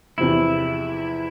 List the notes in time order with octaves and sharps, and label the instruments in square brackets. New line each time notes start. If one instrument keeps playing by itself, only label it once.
[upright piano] E2 C3 F3 [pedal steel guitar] E4